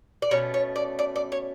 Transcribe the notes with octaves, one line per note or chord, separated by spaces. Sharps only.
D5
B2 A3 C#4 C#5
C#5
D5
D5
D5
C#5